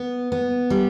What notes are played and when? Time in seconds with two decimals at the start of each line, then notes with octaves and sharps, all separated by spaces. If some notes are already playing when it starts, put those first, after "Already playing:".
Already playing: B3
0.32 B3
0.70 G3